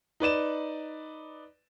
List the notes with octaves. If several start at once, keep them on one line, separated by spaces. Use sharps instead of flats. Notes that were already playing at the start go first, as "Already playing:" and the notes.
D#4 B4 D5 E7